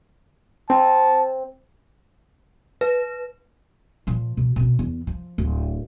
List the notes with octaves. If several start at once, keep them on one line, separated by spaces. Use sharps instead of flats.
C4 A5
B4
A#2 F3
B2
B2 C4
E2
F3
D1